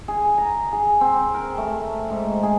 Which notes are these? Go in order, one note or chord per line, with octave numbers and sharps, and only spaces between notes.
G#4
A#5
G#4
C4
A#4
A3
G#2
G#4